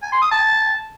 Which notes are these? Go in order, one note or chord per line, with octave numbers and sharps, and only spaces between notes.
G#5
C6
D#6
A5